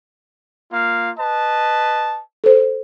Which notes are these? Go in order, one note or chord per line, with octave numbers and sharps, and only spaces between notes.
A#3 F4 F5
B4 D#5 A5
A4 C5